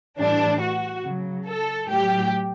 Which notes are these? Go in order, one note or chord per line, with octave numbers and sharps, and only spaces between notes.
A2 E3 G3 D4
F#4
C#3 F#3
A4
A2 F#3 G4